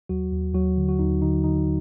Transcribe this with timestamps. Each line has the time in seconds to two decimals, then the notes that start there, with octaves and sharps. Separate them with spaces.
0.09 D#2 F#3 F#4
0.32 D#2
0.54 D#2 F#3 F#4
0.77 D3
0.89 F#4
0.99 D#2 D#4
1.22 D3 D#4
1.44 D3 D#4